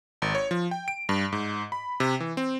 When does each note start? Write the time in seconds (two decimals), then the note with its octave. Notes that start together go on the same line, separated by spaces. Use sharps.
0.22 G#1
0.35 C#5
0.51 F3
0.71 G5
0.88 D7
1.09 G2
1.32 G#2
1.72 B5
2.00 C3
2.20 E3
2.37 C4